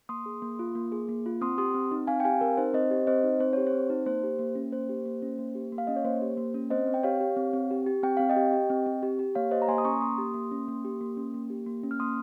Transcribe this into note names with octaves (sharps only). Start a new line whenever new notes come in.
A#3 C6 D#6
G#4
A#3
F4
A#3
G#4
A#3
F4
C4 C6 D#6
G4 C6 D#6
C4
D#4
C4 F5 G#5
G5
G4 F5 G#5
C4 A#4
D#4 C5
C4 C5 D#5
G4
C4 C5 D#5
D#4
C4 C5
G4 C#5
C5
C4
D#4
A#3 C5
G4
A#3
C#4
A#3 C5
G4
A#3
C#4
A#3
G4
A#3
F5
C#4 D#5
C#5
A#3 C5
G4
A#3
C#4
C4 C5 D#5
C4
G5
G4 C#5 F5
G4
C4
C4
G4
G4
C4 G5
C4 F5
D#5 G5
G4
G4
C4
C4
G4
G4
A#3 C#5 F5
G4 C5 D#5
A#5
A#3 G#5 C6
D#6
C#4 A#5 C#6
A#3 C6 D#6
G4
A#3
C#4
A#3
G4
A#3
C#4
A#3
G4
A#3
C#4
F6
A#3 C6 D#6